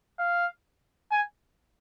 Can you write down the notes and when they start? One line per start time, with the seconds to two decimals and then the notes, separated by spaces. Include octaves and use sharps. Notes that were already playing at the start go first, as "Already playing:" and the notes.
0.19 F5
1.11 G#5